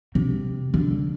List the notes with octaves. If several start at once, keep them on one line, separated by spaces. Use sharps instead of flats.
C3
D3